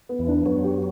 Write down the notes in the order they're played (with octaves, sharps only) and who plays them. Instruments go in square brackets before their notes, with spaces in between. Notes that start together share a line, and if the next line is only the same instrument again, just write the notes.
[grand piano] B3
[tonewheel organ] E2 E3
[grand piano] D4
[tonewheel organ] F#2 F#3 [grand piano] B3
[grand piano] G4